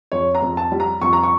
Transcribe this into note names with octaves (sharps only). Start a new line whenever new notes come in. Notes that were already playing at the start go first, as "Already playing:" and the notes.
F2 C#5
A#5
F2
A5
G3
A#5
F2 C#6
A#5
C#6